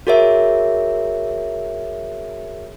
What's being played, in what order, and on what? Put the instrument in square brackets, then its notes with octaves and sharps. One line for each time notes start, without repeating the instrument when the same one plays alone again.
[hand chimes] F#4 G#4 A#4 C#5 E5